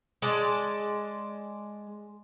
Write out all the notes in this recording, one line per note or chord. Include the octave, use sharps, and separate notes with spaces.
G#3 D5 A5